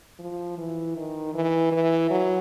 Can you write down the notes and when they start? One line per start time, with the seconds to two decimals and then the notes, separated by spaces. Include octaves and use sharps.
0.19 F3
0.58 E3
0.96 D#3
1.34 E3
1.72 E3
2.10 F#3